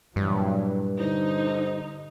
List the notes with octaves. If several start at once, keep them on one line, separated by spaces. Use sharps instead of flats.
G2 A#2 E3 F#3
D3 D#4 C5